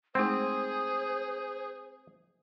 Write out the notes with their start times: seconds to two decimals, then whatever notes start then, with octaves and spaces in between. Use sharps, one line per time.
0.15 G#3 A3 C4 D#4 G#4 C5